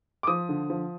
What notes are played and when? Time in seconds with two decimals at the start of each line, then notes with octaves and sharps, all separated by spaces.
0.23 D6
0.27 F3 D#6
0.49 D3
0.70 F3